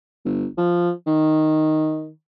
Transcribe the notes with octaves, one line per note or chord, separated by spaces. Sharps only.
G1
F3
D#3